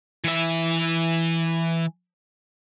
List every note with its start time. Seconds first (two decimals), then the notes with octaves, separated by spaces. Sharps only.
0.24 E3 E5